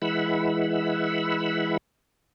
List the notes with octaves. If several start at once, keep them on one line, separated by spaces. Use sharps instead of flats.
E3 G#3 E4 F#5 B5 E6